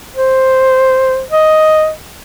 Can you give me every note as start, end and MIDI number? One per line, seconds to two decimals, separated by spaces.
0.15 1.22 72
1.30 1.90 75